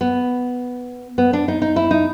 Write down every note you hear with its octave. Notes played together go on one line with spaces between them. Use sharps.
B3
B3
D4
D#4
D#4
E4
D#4